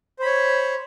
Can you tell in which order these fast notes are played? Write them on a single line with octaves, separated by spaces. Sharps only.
C5 B5 C#5